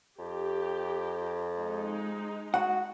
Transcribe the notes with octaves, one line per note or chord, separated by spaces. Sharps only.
F2 G4
G#3 D#4
F#4 F#5